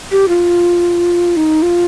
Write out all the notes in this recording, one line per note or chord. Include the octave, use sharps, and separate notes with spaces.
G4
F4
D#4
F4